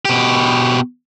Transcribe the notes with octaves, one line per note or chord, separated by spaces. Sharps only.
B2 G4